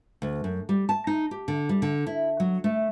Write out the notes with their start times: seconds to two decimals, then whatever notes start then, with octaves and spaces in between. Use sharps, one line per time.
0.22 D2
0.44 F#2
0.69 G3
0.89 A5
1.07 D#4
1.31 G4
1.48 D3
1.69 G3
1.82 D3
2.07 E4
2.40 F#3
2.64 A3